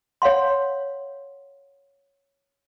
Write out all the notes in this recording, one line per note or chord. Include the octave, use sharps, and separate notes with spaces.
C#5 F5 F#5 C6